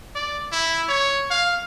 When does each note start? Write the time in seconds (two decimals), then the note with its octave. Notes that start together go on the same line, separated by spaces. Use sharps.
0.15 D5
0.52 E4
0.89 C#5
1.30 F5